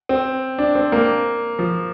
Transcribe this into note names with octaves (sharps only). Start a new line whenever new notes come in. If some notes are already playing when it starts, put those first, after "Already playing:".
C4
D4
C4
A#3
F3